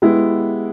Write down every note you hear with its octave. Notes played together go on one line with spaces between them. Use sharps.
G#3 B3 E4 G4